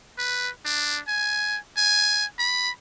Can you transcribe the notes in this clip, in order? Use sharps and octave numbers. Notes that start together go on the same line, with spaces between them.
B4
D4
G#5
G#5
B5